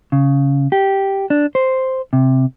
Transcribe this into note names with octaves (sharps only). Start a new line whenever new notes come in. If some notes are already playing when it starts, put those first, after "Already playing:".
C#3
G4
D4
C5
C3